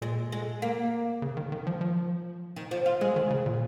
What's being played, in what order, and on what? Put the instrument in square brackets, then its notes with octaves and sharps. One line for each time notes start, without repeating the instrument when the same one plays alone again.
[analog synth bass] A#2 [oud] G#3
[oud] G#3
A#3
[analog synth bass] C#3
D#3
D#3
F3
F3
[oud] D#3
F3
F4
[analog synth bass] G#3 [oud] G#4
[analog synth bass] D#3
C#3
A#2